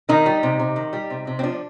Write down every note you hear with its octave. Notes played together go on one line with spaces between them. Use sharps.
D#3 D#4
G3
C3
C3
D#3
G3
C3
C3
C4
F3 D4